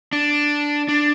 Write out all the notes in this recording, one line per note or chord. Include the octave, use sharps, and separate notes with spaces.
D4
D4